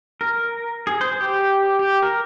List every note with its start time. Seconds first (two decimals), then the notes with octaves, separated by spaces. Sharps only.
0.21 A#4
0.87 G#4
1.01 C5
1.20 G4
1.79 G4
2.02 A#4